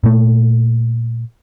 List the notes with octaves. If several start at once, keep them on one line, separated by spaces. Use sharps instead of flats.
A#2 A3